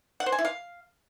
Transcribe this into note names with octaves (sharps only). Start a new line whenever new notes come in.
F#5
C5
G#5
E4
F5